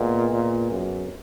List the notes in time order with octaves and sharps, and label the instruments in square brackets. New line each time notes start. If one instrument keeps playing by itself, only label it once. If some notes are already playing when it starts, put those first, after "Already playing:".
Already playing: [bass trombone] A#2 [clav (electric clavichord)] G#3 B3
[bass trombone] A#2
F#2